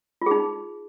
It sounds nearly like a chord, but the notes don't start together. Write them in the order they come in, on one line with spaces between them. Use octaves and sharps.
F4 G#4 D#4